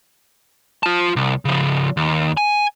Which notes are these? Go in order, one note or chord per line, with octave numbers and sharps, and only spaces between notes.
F4 A5
C2
C#3 F3
D#2
G#5